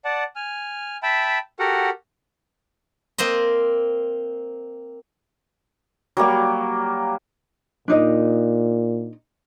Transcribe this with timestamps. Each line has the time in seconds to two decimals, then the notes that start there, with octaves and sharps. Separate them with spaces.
0.05 D5 F#5 A5
0.36 G#5 F6
1.03 E5 G5 A5 B5
1.59 F#4 G4 A4 A#4 F#5
3.18 A#3 C4 C5 D#5
6.17 F#3 G3 A#3 G4
7.88 A#2 D4 D#4 D#5